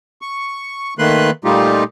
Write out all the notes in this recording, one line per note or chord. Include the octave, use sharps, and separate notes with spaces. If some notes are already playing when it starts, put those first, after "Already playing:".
C#6
D#3 A3 A#3 B4 C6 F#6
A#2 G3 A3 D#4 F4 G4